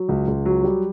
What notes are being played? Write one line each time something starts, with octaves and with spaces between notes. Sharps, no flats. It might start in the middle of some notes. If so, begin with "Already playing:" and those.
Already playing: F#3
C#2
C#2
F#3
G3